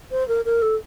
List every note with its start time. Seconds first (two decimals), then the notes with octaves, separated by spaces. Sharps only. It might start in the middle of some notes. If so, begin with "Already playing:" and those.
0.11 C5
0.28 A#4
0.45 A#4
0.61 A4